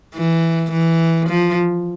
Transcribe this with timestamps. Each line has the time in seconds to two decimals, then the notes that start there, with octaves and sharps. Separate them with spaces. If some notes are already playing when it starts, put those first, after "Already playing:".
0.14 E3
0.71 E3
1.29 F3